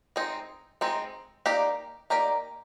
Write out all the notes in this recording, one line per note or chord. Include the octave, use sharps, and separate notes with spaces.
G#3 C4 D#4
G#3 C4 D#4
A#3 D#4 G4 A#4 D5
A#3 D#4 G4 A#4 D5